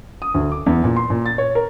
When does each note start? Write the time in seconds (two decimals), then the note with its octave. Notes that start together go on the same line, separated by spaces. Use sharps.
0.22 D#6
0.34 D2
0.52 D6
0.66 E2
0.84 A#2
0.96 C6
1.10 A#2
1.26 A6
1.38 C#5
1.55 A#4